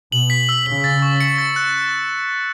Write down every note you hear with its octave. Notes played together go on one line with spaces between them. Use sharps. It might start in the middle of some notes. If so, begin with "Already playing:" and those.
B2 F#7
B6
E6
C#3 F#7
A6
C#6
C#7
A6
F#6